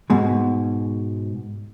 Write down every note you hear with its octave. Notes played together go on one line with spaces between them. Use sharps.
G#2 B2 G#3